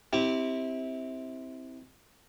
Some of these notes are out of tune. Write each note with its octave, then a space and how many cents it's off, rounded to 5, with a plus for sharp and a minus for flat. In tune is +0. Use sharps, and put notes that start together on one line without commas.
C4 +0 E4 -25 G4 +0